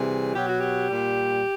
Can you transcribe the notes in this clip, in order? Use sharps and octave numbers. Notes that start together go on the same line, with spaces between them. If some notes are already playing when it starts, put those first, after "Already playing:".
Already playing: C3 E3 G3 G#4
B2 F#3 G4
F#4
G4
A#2 G3